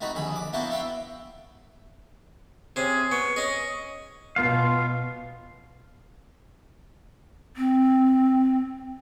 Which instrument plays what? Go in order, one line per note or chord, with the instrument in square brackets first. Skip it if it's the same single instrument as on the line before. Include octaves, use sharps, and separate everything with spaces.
[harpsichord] A3 C4 D#4 F#4 B4
A#1 D#2 D3 G#4 B5
D6
A#3 B3 D4 E4 F#4 C5
B3 E5 F5 G5 B5
[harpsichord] C3 C#4 [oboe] G#4
[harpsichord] B3 [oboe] C#6
[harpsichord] C#4 G#4 [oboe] D#5
[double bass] B2 B3 [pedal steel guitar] F4 F5
[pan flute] C4